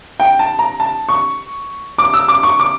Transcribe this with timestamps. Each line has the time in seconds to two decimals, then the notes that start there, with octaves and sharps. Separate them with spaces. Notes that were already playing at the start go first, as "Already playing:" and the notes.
0.20 G5
0.39 A5
0.59 A#5
0.80 A5
1.09 C#6
1.98 D6
2.14 E6
2.28 D6
2.43 C#6
2.59 D6